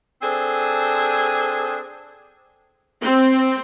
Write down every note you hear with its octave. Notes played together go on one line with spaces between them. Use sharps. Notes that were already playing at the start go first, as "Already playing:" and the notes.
C4 D4 G#4 A4 C5
C4